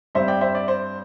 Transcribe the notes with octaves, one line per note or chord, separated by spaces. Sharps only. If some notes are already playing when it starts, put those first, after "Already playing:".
G2 G3 C4 C5 E5
D5 G5
C5 E5
D5
C5